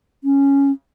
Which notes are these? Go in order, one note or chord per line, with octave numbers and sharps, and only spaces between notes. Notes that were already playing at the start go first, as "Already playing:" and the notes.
C#4